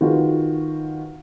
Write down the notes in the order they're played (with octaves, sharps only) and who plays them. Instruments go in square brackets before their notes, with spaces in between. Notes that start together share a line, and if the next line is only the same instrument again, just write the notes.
[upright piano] D#3 F4 F#4 G#4 B4